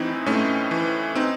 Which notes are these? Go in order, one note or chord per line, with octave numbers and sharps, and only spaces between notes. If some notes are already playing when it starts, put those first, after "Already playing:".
Already playing: A2 E3 C4 D#4 E4
A2 A3 C#4
E3
C4 D#4